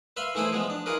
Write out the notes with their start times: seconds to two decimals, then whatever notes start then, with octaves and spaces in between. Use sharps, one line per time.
0.17 B4 E5 F5 B5 C6
0.35 E3 A3 E4 G#4 B4 C5
0.53 F3 G#3 B3
0.70 D4
0.86 D#4 F4 G#4 A#4 B4